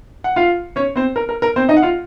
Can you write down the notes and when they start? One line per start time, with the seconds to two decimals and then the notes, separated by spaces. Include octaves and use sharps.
0.24 F#5
0.36 F4 F5
0.76 C#4 C#5
0.96 C4 C5
1.16 A#4
1.29 A#4
1.42 A#4
1.56 C4 C5
1.69 D#4 D#5
1.77 F#5
1.82 F4 F5